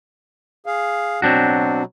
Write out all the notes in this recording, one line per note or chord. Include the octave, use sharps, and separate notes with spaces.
G#4 F5
B2 F#3 C4 D4 F#4